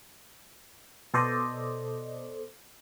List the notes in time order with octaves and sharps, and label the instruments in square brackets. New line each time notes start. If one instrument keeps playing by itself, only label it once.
[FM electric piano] B2 A4 C5 D5 D#5